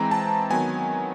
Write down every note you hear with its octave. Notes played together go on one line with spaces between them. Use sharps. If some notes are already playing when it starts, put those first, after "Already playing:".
Already playing: E3 G#3 C4 A#5
A5
D#3 F#3 B3 G#5